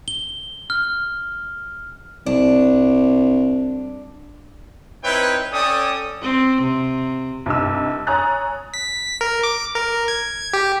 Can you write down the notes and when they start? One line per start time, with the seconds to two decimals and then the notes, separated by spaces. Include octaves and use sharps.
0.08 G7
0.70 F6
2.26 C2 D4
5.03 C4 D#4 E4 B4 C#5 G5
5.52 C#4 A4 D5 G5 D#6
6.22 C4
6.62 C3
7.46 C2 G2 D#4 E6
8.07 C#5 G#5 A#5 D#6 F#6 A6
8.74 B6
9.21 A#4
9.43 D6
9.75 A#4
10.08 G#6
10.53 G4